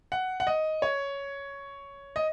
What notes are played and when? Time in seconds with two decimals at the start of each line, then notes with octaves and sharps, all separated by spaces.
0.12 F#5
0.40 F#5
0.47 D#5
0.82 C#5
2.16 D#5